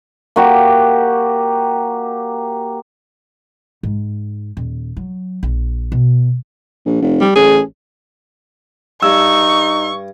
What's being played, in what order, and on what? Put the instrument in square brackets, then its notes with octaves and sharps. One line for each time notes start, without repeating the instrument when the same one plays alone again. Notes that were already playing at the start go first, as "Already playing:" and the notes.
[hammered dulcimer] A#3 F#4 G4
[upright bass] G#2
D#1
F#3
A#1
B2
[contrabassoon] A#1
F1
[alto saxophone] G3
[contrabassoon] A1 [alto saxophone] G#4
[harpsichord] G2 [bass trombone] D#4 [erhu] C#6 [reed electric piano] E6